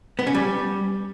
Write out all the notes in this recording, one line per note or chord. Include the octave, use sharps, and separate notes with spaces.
B3
C#4
G3